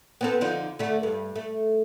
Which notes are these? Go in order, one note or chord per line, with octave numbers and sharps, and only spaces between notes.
B3 C4 A4
D3 F3 D#4
D3 A3
G2
A3